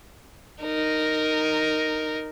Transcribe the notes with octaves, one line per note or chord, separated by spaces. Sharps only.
D#4 A#4